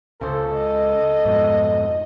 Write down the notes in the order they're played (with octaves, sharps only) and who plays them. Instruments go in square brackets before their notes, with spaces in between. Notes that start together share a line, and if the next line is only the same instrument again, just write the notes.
[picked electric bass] C#2 C#3 [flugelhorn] A4 [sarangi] C5
[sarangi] D#5
[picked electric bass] F2 G#2 B2